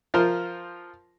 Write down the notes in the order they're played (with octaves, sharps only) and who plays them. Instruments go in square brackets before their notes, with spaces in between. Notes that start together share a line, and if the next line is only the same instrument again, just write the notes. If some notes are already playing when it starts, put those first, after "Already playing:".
[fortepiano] F3 F4 A#4 C5